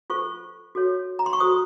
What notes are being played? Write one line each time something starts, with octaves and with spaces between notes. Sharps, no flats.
F4 A4 C5 C#6
F#4 A4 C#5
A#5
C6
C#6
F#4 A4 C5 D#6